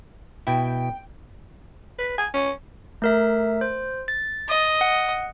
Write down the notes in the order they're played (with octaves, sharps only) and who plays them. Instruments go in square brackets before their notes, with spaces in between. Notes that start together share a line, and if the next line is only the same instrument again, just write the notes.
[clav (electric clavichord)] B2 E4 [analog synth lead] G5
[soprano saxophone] B4
G#5
C#4
[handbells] A3 A#4 E5
C5
A6
[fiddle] D#5
[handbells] F#5